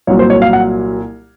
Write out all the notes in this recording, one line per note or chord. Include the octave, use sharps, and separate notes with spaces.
C2 A#2 F#3 C#5
C5
C#5
F5
F#5